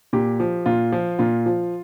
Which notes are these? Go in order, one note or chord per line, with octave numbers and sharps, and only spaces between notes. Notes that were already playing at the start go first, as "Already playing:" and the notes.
A#2 G4
F3
A#2 F4
F3
A#2 F4
F3